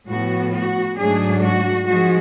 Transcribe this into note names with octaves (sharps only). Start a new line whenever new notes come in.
A2 F3 B3 F#4
F#4
G#2 F#3 A3 D4 G#4
F#4
G#2 F3 G#3 F#4